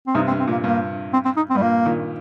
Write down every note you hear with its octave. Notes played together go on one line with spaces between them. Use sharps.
C4
G2 C3 D#4
C4
G2
C4
A#2 A#3
G2 A#3
C4
C4
D#4
C4
G2 G3
A#2 A#3
A#2 D#3